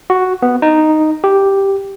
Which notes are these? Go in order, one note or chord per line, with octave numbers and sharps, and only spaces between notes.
F#4
B3
D#4
G4